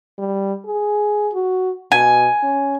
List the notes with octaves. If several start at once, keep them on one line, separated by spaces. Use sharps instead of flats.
G3
G#4
F#4
B2 G#5
C#4